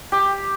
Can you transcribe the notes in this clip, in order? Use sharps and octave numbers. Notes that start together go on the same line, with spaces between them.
G4